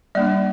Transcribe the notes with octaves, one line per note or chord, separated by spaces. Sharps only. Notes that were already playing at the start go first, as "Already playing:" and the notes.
G3 A#3 D4 D5